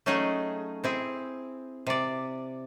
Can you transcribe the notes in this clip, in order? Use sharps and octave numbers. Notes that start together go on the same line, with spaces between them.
F#3 A3 C#4 D#4 G#4
C4 E4 G#4
C3 D5